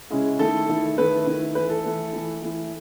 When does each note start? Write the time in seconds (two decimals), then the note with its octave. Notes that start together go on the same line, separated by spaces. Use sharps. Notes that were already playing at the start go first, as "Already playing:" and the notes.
0.10 C#3 G#3 C#4 E4
0.39 D#3 A3 E4 A4
0.69 D#3 A3 E4
0.98 D#3 A3 E4 B4
1.26 D#3 A3 E4
1.55 E3 A3 E4 B4
1.70 A4
1.84 E3 A3 E4
2.13 E3 A3 E4
2.42 E3 A3 E4